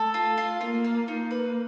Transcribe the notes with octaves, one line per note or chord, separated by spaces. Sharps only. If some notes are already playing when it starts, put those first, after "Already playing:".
Already playing: A3 A4
F4
F4
A#3 F4
F4
A#3 D#4
B4